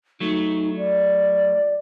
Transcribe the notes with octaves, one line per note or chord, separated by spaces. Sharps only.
F#3 A3 D#4
D5